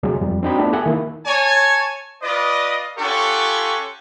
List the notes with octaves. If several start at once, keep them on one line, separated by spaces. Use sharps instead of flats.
D2 C3 F#3 G#3
F2 G3
C4 D4 D#4 F#4 G5 B5
A3 B3 D4 E4 F4
G4 A4 E5 F#5 G#5
D#3 A#3 D#4 E4
C#5 G#5 A5
F4 B4 D5 D#5
C#4 F4 G4 A4 F#5 C#6